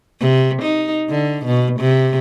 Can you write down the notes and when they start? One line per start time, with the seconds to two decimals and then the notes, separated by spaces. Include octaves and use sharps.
0.20 C3
0.62 D#4
1.10 D3
1.46 B2
1.80 C3